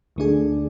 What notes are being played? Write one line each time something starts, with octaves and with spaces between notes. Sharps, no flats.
D2 D3 A3 D4 G#4